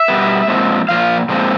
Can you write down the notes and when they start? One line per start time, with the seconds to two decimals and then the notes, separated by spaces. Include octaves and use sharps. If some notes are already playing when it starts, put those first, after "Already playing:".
Already playing: E5
0.08 B2 G3 B3
0.48 A#2 F3 G#3 C4
0.89 A#2 F3 F5
1.29 A#2 F3 G#3 C4